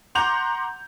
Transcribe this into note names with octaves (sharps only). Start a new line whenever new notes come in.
F#5 A#5 C6 D6 G6 F7